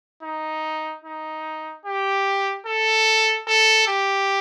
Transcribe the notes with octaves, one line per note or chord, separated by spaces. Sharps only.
D#4
D#4
G4
A4
A4
G4